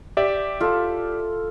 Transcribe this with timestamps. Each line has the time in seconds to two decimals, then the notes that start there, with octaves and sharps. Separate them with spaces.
0.17 G4 D5 E5
0.60 F4 A4